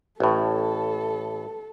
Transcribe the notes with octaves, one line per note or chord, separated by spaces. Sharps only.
A1 A2 A4